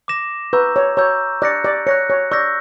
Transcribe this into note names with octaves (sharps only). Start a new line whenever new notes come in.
D6 A#6 E7
B4 A#5 C#6 E6 G6
C#5
C#5 A#5 C#6 E6 G6
D5 F#6 A#6 C#7
D5
C#5 F#6 A#6 C#7
C#5
D5 C#6 E6 G6 A#6